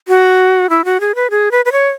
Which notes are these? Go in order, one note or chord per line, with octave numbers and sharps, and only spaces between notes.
F#4
E4
F#4
G#4
B4
G#4
B4
B4
C#5